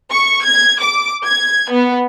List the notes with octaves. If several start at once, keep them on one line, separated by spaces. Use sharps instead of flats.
C#6
G#6
D6
G#6
B3